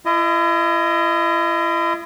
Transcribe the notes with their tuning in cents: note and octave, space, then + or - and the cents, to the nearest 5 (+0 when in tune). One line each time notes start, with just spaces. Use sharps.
E4 +40 D#5 +0